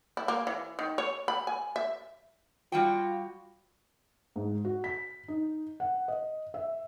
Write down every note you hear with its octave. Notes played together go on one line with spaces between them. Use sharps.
E4
A#3
E3
D#3
C#5
B5
G#5
E5
G3 F4 F#4 G5
G#2
F#4
B6
D#4
F#5
D#5
E5